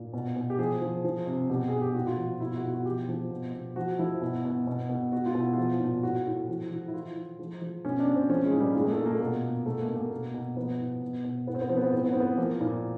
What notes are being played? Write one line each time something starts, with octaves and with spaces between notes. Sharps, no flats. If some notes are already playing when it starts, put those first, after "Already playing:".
Already playing: A#2
B2
B2
G4
F3 G#4
F3
F3
C3
B2 G4
B2 G#4
G4
A#2 F#4
F4
F3 F#4
B2 E4
F4
F#4
B2 F4
F#4
F3 G4
F3
B2
B2
F3 F#4
F3 E4
B2
B2
B2
B2
B2 F#4
F4
B2
E4
F3 F4
A#2
A2 F#4
A2
F3
F3
E4
E3 F4
E3
F3
F3
B2 C#4
D4
B2
C4
F3 C#4
G#3
A#2
G3
A#2 G#3
A#3
A3
A#2
A#3
A3
B2 A#3
B2
B2 A3
A#3
B2
A#3
B2
B2
F3 B3
A2
B2
B2
A2 B3
C4
B3
F3 C4
B3
C4
A2 B3
C4
B3
A2 C4
B3
F3 A#3
A#2